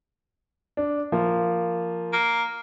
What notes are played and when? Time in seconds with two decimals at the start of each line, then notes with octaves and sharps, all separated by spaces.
0.77 D4
1.12 F3 A#3
2.13 A#3